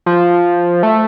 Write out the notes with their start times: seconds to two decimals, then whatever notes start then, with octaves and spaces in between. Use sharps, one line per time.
0.06 F3
0.83 A3